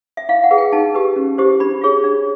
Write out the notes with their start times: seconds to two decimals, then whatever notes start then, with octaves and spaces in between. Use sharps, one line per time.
0.17 E5
0.29 E4 F5
0.43 F#5
0.51 G#4 B4
0.58 G5
0.72 D#4 A5
0.95 G4 B4
1.16 C#4
1.38 E4 G4 C5
1.60 D4 B5
1.81 F4 G#4 C#5
2.04 D4